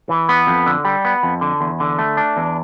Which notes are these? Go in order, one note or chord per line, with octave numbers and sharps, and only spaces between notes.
E3
B3
F2
D3
G3
B3
F2
D3
E2
D3
A3
D4
E2